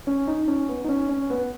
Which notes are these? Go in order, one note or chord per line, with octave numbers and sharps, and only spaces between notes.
C#4
D#4
C#4
B3
D#4
C#4
C#4
B3